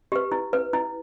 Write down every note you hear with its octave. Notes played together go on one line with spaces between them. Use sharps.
G4 B4
E4
B4
E4